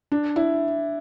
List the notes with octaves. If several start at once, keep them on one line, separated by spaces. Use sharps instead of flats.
D4
E4